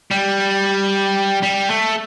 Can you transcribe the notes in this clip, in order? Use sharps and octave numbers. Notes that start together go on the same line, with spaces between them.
G3
G3
A3